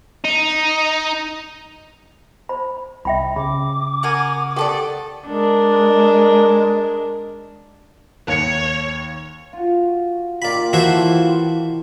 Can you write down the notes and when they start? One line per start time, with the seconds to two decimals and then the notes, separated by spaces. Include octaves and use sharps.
0.25 D#4
2.49 C5 B5
3.05 C2 E5 G5 B5
3.36 C#3 B5 D6
4.03 F#4 A#4 G#5
4.56 B3 G4 A4 A#4 D5 G5
5.27 G#3 D4 A#4
8.28 D#2 C#5 C#7
9.53 F4 F#4
10.42 D#3 A#3 F4 G4 D5 B5
10.73 E3 E4 F#4 C5 D#5 A5